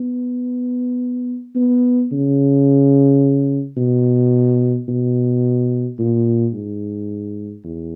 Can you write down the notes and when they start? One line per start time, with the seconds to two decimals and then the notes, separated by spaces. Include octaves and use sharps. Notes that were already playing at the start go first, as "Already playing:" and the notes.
Already playing: B3
1.56 B3
2.12 C#3
3.77 B2
4.88 B2
5.99 A#2
6.53 G#2
7.64 E2